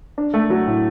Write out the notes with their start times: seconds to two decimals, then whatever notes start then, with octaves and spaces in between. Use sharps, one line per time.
0.18 D4
0.34 A3
0.50 F#3
0.67 A2